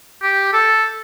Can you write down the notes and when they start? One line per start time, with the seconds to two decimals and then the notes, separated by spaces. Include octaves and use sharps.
0.23 G4
0.53 A4